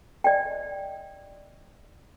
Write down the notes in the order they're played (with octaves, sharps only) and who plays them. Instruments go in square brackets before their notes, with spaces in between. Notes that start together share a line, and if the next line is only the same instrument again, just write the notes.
[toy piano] D5 D#5 G5